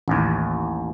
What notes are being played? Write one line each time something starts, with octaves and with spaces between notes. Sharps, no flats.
A1 D#2